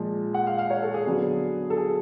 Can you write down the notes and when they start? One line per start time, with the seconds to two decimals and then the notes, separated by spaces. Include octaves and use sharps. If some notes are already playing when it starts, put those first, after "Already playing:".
Already playing: A#2 F3 G#3
0.34 F#5
0.47 F5
0.59 F5
0.70 C#5
0.82 A4
0.94 G#4
1.06 D3 F#3 B3 D4
1.70 A4
1.77 G#4